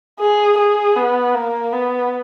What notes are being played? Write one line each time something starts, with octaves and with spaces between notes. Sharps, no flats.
G#4
G#4
B3
A#3
B3